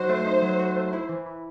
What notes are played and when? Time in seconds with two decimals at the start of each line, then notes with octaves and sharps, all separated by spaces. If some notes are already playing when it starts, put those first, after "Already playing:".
Already playing: F#3 D#4 F#4 C5
0.09 A3
0.26 D#4
0.42 F#3
0.59 F#4
0.76 A3
0.93 E4
1.09 E3
1.26 E3